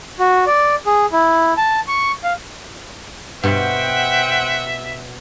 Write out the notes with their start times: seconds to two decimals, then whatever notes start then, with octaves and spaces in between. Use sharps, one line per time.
0.19 F#4
0.47 D5
0.86 G#4
1.12 E4
1.57 A5
1.88 C#6
2.24 F5
3.44 G2 B2 C5 E5 F#5 G5